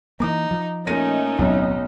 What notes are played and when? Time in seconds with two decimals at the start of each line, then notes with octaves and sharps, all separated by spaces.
0.20 E3 A#3 D#4 A#5 D6
0.51 F3
0.87 A#2 A3 C#4 D#4 A#6 D#7
1.39 D1 B1 F#3 C4